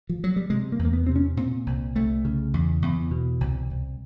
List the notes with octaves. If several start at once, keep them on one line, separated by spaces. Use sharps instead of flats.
F3
F#3
G3
C3 G#3
A#3
E2
A#3
B3
C3 C4
C#4
A#2 C4
C2
C2 A3
C#3
E2
E2
B2
C2
C2